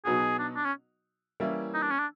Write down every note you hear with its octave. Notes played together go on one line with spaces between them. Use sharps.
B2 F#3 B3 D#4 F#4 G#4
D4
D4
C#4
E3 G3 A#3 C#4 E4
D#4
D4
C#4
D4